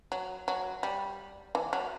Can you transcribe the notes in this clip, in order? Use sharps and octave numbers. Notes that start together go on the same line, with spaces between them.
F#3
F#3
G3
E3
F#3